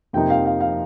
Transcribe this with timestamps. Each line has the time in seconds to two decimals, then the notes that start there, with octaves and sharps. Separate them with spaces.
0.13 F2 C3 F3 A#3 D#4 G5
0.30 F5
0.45 F5
0.61 F5